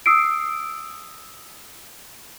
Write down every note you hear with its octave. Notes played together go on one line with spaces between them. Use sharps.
D#6 E6 C7 D7